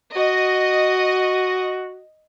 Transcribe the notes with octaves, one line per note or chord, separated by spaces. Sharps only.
F#4 D#5